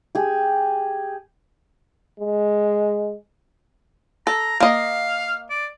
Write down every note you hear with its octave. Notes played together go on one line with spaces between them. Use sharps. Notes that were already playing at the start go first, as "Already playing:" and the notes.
G4 G#4
G#3
A4 A#5
A#3 D#5 F5
D5